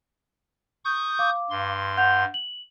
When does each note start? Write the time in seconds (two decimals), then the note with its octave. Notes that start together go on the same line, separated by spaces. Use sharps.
0.85 C#6 D#6 G6
1.19 F5 D6
1.50 G2 C6
1.97 F#5 G6 F7
2.34 F#7